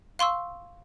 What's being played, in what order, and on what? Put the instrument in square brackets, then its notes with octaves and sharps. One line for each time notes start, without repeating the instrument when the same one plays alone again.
[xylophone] F5 C6 C#6 E6